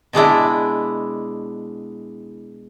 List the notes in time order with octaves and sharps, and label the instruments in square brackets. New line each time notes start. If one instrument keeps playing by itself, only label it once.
[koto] B2 G#3 D4 E4